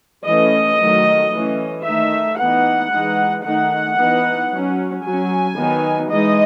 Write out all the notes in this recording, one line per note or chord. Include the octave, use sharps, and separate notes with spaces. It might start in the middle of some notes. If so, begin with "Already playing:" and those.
E3 A3 C#4 D#5
D#3 F#3 A3
E3 A3 C#4
D#3 A3 D#4 E5
E3 B3 D#4 F#5
E3 G#3 D#4
D#3 A3 D#4 F#5
E3 B3 D#4
F#3 C#4
F#3 C#4 G#5
D#3 F#3 B3 D#4
E3 G#3 D#4 D#5